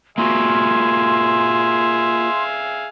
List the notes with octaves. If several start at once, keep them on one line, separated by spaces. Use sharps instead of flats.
A#3 F4 F#4 G#4 E5 F5 C6